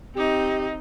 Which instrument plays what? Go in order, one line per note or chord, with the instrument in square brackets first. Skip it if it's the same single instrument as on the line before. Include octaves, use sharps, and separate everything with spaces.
[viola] C4 D#4 [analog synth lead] G4